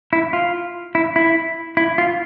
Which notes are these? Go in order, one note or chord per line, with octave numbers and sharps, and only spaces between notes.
E4
F4
E4
E4
E4
F4